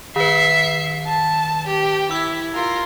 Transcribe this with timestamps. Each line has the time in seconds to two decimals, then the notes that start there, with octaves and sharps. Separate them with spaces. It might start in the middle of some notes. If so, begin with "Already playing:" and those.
0.16 D#3 B4 E5 C7
1.07 A5
1.67 G4
2.11 E4 E6 G#6
2.55 F4 A#4